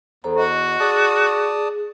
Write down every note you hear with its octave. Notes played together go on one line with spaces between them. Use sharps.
E2 A4 C5 A#5
F#4 D#5
G#4 D5 A5 D#6